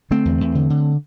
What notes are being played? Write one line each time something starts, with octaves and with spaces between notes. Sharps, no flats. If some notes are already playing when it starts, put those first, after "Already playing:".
D3 A3 C4
E2
E2
D3
D3